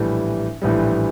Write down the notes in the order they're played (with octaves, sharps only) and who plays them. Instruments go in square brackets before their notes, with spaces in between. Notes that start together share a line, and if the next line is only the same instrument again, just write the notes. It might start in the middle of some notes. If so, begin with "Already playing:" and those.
Already playing: [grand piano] A#1 A2 E3 G3
A#1 A2 E3 G3